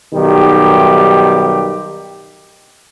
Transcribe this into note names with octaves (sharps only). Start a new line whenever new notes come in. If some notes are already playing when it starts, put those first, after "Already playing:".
B1 D#3 G3 G4